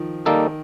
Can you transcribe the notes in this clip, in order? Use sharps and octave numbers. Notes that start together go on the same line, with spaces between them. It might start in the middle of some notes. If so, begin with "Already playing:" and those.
Already playing: D#3 F3
D#3 G3 A#3 D#4 A4